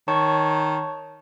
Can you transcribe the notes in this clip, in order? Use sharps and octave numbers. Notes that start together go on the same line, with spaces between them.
D#3 C#5 A5 C#6